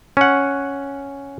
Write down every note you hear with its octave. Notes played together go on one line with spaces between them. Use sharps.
C#4 F#5